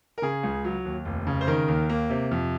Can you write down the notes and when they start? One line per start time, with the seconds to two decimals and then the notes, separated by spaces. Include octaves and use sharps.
0.18 A#4
0.22 C#3 G#4
0.43 C#2
0.64 F#3
0.85 D#2
1.05 F1
1.27 C#3
1.41 C5
1.47 D#3 A#4
1.68 D#2
1.89 A#3
2.10 C3
2.31 F2